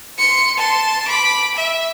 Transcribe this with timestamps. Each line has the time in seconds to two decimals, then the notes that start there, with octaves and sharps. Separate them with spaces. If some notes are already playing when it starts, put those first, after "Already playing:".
0.18 C6 C#7
0.57 A5 C6
1.08 B5 D6
1.56 E5